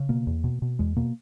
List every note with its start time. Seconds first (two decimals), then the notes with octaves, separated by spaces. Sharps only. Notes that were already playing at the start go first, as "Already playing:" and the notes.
Already playing: C#3
0.09 B2 A#3
0.27 E2
0.44 B2
0.62 B2
0.79 E2 G#3
0.96 B2 A#3